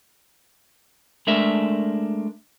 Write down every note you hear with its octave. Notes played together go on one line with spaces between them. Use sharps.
G#3 A3 D4 A#4 E5